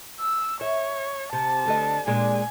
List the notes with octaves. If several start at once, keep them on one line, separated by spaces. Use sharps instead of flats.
E6
C#5 E5
C3 A5
D2 D3 D#5
A#2 G#3 D4 G#5